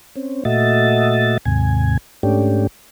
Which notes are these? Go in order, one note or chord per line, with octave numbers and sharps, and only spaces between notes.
C4 C#4
A#2 A3 F#4 D#5 E5 A6
D#2 G#2 C3 G#5
G#2 A3 C#4 D4 G4